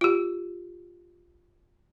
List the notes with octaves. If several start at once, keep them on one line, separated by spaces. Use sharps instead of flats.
F4 G4